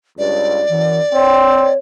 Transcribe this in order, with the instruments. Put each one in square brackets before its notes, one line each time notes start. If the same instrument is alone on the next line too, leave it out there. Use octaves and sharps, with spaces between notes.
[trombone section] C#2 G2 [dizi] D5
[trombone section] F#2 [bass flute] E3
[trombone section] C4 [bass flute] C#5